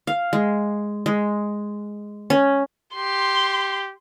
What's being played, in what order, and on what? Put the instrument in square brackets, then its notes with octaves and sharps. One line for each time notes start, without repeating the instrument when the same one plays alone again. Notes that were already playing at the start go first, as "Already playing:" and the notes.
[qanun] F5
G#3
G#3
C#4
[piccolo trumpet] G4 [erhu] C6